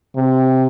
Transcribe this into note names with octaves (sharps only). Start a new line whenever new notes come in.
C3